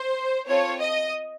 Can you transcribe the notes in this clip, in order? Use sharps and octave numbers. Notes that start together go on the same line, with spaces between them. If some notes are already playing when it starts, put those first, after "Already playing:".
Already playing: C5
C4 F4 A4 C#5
D#5